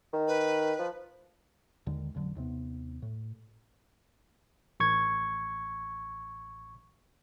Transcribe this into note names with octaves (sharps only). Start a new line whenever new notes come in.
D#3
B4
F3
D#2 D3 D#3 G#3
A1 F2 D3 F#3
D#2 C3 B3
A2
A1 C#6 G#6